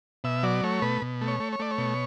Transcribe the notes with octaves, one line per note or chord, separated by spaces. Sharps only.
B2 E5
F#3 D5
A3 C#5
B2 B4
B2
A3
C#5
A3
C#5
A3 D5
C#5
B2